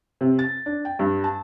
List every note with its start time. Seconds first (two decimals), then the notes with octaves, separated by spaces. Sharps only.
0.21 C3
0.39 A6
0.66 D4
0.85 G5
0.99 G2
1.24 A5